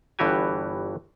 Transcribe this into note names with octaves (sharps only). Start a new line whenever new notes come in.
G1 G2 E3 F#4 G4 G#5